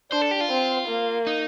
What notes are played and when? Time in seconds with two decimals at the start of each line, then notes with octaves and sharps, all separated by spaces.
0.11 D4 C5
0.22 A4
0.31 G4
0.41 F4
0.50 C4
0.88 A#3
1.27 D#4